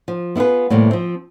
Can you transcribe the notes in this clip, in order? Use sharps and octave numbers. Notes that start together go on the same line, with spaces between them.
F3
B3 E4 F4 G#4 B4
A2 C3 E3 G3 A#3
F3 C4